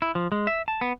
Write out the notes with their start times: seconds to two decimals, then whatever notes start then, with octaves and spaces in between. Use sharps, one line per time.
0.02 E4
0.15 F3
0.32 G#3
0.47 E5
0.68 A5
0.81 B3